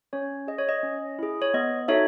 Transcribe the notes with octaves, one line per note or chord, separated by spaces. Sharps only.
C#4 C#5
G#4 D#5
C#5
D#5
C#4
E4 G#4
C#5
B3 D#5
D#4 F#4 A4 C#5 E5